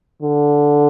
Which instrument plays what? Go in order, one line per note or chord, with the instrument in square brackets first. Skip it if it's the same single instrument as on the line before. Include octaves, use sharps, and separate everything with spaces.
[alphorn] D3